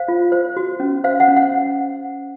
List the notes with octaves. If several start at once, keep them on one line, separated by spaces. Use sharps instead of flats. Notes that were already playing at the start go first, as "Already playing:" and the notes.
Already playing: C5 F5
F4
C5
F#4
C#4
C5 F5
F#5
C#4
F#5